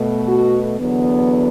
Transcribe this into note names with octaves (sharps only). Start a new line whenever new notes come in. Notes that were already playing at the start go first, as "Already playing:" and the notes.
Already playing: B2 A3
F#4
E2 D3 F#3 B3